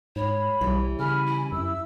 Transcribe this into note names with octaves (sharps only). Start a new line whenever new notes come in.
G#2 C#5 B5
B1 E3 G3
C#3 G#5 B5 F6
E4
F#2 E5 E6